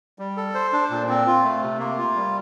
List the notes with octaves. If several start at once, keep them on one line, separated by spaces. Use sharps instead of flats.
G3
A4
C5
D4
A#2
C4
F4
A3
C3
A#3
F4
G3